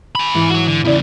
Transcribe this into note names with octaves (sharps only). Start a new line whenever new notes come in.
G#4 B5
G#2 E3
F#4 C#5
D3
E2 C#3 E4 D5